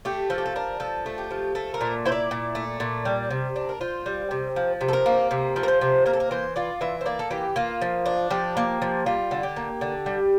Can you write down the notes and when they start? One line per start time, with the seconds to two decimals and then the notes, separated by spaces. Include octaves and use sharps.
0.05 A3 G4
0.30 F3 A4
0.38 G4
0.46 A4
0.56 D4 A#4
0.80 F3 A4
1.06 A3
1.18 G4
1.31 F3
1.55 A3 A4
1.74 A#4
1.81 A#2
2.06 E4 C5
2.12 D5
2.31 A#2
2.55 A3
2.80 A#2
3.05 G3
3.31 C3
3.56 D4
3.69 A#4
3.81 F4 C5
4.06 G3
4.31 C3
4.56 F3
4.81 C3
4.88 A4
4.93 A#4
5.06 A#3
5.31 C3
5.56 F3
5.63 A#4
5.68 C5
5.81 C3
6.06 A#3 A#4
6.13 A4
6.20 A#4
6.31 E3 C5
6.56 F4 D5
6.81 E3 E5
7.01 C5
7.06 A#3 D5
7.19 A4
7.31 E3 G4
7.56 A#3 F4
7.81 F3
8.06 D4
8.31 F3 G4
8.57 A#3
8.82 F3
9.06 G3 F4
9.31 D3
9.43 G4
9.56 A#3
9.81 D3
10.06 G3